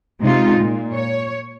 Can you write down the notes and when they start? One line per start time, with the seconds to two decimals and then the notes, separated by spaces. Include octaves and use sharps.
0.20 C3 G#3 D#4 F4
0.59 A#2
0.94 C#5